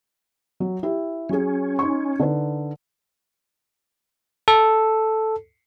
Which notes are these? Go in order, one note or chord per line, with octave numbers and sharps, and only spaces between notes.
F#3
E4 G4
F#3 C#4 G#4
D#4 C6 C#6
D3 D#4 B4
A4